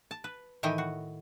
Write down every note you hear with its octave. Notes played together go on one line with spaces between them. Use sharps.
A5
B4
A2 D#3 E3 E4 D#5 G5
F#4